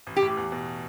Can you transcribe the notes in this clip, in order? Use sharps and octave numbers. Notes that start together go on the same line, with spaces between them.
A1
G4
A2
E2
B2